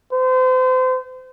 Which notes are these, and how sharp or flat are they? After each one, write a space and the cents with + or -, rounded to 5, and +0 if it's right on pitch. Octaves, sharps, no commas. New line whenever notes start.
C5 -35